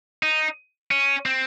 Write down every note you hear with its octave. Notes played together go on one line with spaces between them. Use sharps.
D#4
C#4
C4